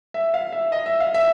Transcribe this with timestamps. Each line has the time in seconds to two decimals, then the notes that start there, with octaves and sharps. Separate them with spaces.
0.14 E5
0.34 F5
0.52 E5
0.72 D#5
0.86 E5
1.00 F5
1.14 E5